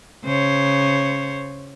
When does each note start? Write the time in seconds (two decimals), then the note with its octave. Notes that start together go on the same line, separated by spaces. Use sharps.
0.24 C#3 C5 C#5